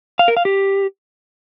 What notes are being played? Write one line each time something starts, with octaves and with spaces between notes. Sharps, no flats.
F5
A#4
F5
G4